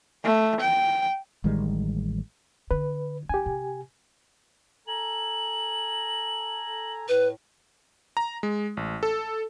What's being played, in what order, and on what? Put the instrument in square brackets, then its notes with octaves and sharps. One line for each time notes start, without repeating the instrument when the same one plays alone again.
[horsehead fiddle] A3
G5
[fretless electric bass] A1 D#3 G3 G#3
[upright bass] D3 [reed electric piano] B4
[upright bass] D4 [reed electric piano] G4 G#5
[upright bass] C3
[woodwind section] A4 G#5 A#5 [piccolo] F#7
[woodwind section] A2 [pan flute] B4
[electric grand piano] A#5
G#3
A1
A4